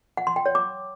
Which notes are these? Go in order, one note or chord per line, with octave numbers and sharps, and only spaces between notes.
F#5
C6
G5
C#5
D6